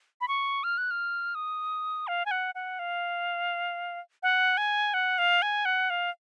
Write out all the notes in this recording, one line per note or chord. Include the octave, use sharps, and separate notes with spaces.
B5
C#6
F6
F#6
F6
D#6
F5
G#5
F#5
F#5
F5
F#5
G#5
F#5
F5
G#5
F#5
F5